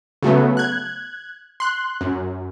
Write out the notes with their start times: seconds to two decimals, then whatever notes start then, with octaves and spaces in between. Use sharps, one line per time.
0.23 C#3 F#3 A3 B3
0.57 F#6 G#6
1.60 C6 F#6
2.01 F#2